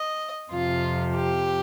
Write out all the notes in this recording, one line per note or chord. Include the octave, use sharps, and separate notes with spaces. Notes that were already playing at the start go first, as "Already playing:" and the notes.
Already playing: D#5
F2 C3 F3 F4
G4